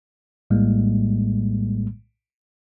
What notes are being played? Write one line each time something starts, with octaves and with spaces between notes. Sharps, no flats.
A#1 A2 G3 G#3 A#3